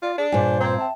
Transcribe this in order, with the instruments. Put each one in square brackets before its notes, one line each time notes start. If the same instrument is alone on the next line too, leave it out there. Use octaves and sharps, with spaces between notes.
[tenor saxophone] F4 [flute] D5
[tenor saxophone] D4 [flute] G#4
[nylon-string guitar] G2 A#2 [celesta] G#4 C#5 G#5 [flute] C5
[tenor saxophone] C4 [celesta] A#5 G#6
[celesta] E5 G5 [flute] A5